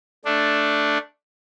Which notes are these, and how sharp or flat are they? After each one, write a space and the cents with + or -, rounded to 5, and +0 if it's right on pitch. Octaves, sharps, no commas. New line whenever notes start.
A3 +0 D4 +0